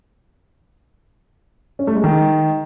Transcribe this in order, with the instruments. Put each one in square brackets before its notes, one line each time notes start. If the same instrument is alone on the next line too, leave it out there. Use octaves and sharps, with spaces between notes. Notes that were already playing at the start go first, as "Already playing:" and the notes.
[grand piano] C#4
A3
G#3
D#3